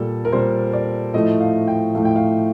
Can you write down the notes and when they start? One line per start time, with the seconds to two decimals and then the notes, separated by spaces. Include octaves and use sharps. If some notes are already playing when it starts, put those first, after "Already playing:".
Already playing: A#2 G3 A4
0.25 A#4
0.32 A#2 G3 C5
0.73 D5
1.14 A2 F3 A3 D#5
1.40 F5
1.68 G5
1.95 A2 F3 A3 F5
2.05 G5
2.16 F5